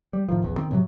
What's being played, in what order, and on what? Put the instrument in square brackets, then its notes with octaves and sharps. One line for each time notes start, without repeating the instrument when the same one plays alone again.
[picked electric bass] G3
A2 D#3 F3
D#1 A#1 E2
D#3 C4
D2 A2 C3 F#3